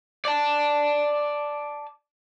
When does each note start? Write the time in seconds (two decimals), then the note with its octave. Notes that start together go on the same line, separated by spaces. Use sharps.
0.25 D5 A5